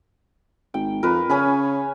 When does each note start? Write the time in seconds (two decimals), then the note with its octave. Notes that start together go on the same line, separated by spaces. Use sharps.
0.74 G#1 G5
1.03 F2 A#4 B4
1.30 C#3 C#4 G#5 B5